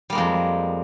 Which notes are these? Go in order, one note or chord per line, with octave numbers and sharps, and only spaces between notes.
F2 G3 G#3 A#3